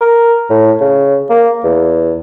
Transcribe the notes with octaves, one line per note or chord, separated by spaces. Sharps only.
A#4
A2
C#3
A#3
E2